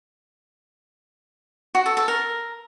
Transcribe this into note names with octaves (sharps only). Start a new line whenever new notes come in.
F#4
A4
A4
A#4